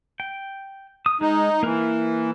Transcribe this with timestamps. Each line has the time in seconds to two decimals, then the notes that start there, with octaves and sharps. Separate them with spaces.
0.20 G5
1.06 D#6
1.21 G#3 D#4
1.63 E3 A#3 A#4 B4